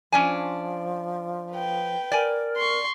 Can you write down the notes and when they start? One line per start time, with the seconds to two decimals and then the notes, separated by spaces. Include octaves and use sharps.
0.12 F3 C#4 D4 G#5
1.52 B4 G5
2.12 A#4 D5 G#5
2.57 C6 C#6